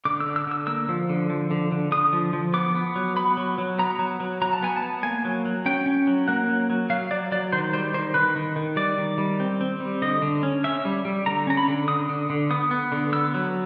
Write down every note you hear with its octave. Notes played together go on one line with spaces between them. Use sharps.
D3 D6
E6
D3
E6
D3 E6
A#3 E6
F3
D3
F3
D3
D3
D3 D#6
F3
F3
B3 D6
B3
F#3
B3 B5
F#3
F#3
B3 A#5
F#3
F#3
F#3 A#5
A5
B3 G#5
A5
B3
A#3 G#5
F#3
F#3
C#4 G5
C#4
F#3
A#3 F#5
F#3
F#3
F#3 F5
F#3 D5
F#3 D5
D#3 C5
G3 C5
D#3 C5
D#3 B4
D#3
D#3
G3 D5
D#3
G3
C4
C4
G3
D3 D#5
D3
C#4
C#4 E5
G3
G3
D3 A#5
C#4 A#5
B5
D3
D3 D#6
D3
D3
B3 D#6
B3
D3
B3 E6
F#3